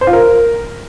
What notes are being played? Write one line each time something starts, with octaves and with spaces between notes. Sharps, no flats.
C5
F4
A#4